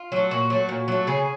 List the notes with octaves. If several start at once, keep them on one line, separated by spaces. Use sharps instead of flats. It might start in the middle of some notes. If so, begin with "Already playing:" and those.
Already playing: F4
F#3 A3
A#2 F#4
F#3 A3
A#2
F#3 A3
C#3 G#4